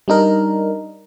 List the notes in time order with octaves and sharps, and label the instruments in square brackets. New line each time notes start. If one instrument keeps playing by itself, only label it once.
[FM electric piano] G3 D4 D#4 A#4